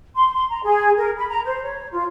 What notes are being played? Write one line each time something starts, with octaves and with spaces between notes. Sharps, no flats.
C6
C6
A#5
G#4
A#4
B5
A#5
C5
C#5
F4